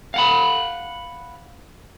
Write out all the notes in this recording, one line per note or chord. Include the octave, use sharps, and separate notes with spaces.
F5 F#5 B5